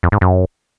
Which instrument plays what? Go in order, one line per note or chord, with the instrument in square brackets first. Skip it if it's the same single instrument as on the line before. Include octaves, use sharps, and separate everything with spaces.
[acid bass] F2
G#2
F#2